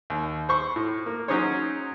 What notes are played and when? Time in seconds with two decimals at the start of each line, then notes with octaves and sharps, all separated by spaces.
0.10 D#2
0.49 C5 B5 C#6
0.76 A2
1.06 A#3
1.28 F#3 C#4 D#4 G#4 C5 C#5